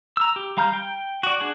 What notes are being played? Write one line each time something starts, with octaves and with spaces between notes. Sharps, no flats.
A#5 E6
G4
G3 F5 A#5 F6 G6
G5
F#4 D5
D4 G#4 F#5